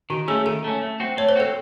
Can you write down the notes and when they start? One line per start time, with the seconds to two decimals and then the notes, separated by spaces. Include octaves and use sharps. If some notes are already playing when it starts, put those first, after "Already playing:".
0.10 D#3 F#4
0.28 A3 C#4 G#4
0.45 D#3 A4
0.64 A3 C#4
0.82 A3
1.00 C4 F#4
1.17 A3 C#5
1.29 C5
1.36 C4 F#4 A4